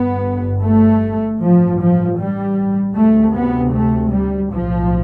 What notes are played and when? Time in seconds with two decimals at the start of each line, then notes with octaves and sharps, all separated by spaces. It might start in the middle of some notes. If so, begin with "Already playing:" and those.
Already playing: G1 G2 B3
0.63 A3
1.41 A1 G2 F3
1.81 F3
2.19 G3
2.96 D2 C3 A3
3.35 B3
3.73 A3
4.13 G3
4.52 B1 A2 F3